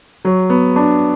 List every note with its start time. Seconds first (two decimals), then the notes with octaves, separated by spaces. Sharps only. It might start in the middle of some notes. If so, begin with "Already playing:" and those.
0.25 F#3
0.50 B3
0.76 D4